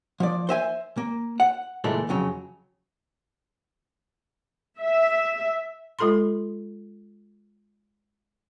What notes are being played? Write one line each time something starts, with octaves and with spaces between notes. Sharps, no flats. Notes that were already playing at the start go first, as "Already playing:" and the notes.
F3 D5
C5 E5 G#5
A#3
F#5
C#2 A#2 E3 G#3 A3
F2 C#3 F#3
E5
G#3 F4 A4 B5 C6